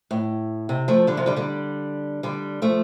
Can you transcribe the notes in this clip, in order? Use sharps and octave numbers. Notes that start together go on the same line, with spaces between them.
A2
C3
F3 A3
D3 G3
C3 F3
D3 G3
D3 G3
D3 G3
F3 A3